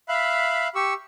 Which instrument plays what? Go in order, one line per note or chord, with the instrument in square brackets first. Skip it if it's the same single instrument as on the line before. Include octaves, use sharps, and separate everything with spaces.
[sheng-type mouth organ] E5 F5 B5 F#6
G4 C#6 E6